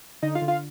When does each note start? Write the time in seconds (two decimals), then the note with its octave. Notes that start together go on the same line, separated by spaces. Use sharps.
0.22 D3 D#4 D#5
0.35 F4 F5
0.42 D3
0.48 F4 F5